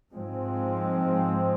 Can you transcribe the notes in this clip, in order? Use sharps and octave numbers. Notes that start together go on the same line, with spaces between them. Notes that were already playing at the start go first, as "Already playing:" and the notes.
G#2 F3 G#3 C4